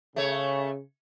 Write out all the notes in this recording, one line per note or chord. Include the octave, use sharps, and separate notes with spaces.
C#3 A3 C#5